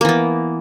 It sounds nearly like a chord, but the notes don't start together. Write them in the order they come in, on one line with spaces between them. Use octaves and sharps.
A#3 E3 B3